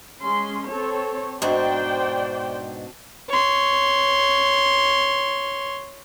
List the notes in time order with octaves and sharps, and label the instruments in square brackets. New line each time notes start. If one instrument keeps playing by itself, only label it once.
[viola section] G#3 C#4 C6
C4 A4 C#5
[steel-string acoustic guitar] G#2 B2 D4 [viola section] C5 D5 G5
[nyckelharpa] C#5 C6